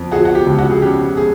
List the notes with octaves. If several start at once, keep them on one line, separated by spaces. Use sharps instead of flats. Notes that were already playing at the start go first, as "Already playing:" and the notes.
Already playing: F2
F3 F#4 G#4
F#4
G4
C#2
F#4
G#4
C#3 G4
G#4